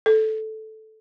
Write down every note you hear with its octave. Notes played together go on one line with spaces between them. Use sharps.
A4